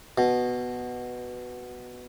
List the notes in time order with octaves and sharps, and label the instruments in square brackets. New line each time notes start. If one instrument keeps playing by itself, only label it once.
[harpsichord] B2